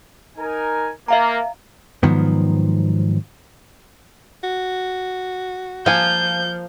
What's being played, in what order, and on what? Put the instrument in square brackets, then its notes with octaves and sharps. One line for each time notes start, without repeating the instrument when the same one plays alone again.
[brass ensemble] D#4 A#4 G#5
[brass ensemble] A#3 [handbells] E5 F5 A#5
[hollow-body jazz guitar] G#2 D#3 F3 F#3 B3
[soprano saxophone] F#4
[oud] F3 [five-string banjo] A#3 G#5 [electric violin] G6